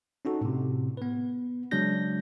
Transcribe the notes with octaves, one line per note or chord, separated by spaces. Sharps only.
C#4 D#4 F#4 A4
A2 C3
B3 B4
C#3 F#3 G#3 D4 G6 A#6